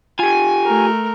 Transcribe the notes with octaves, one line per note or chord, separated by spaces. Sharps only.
F4 G4 G#5
A3 A#4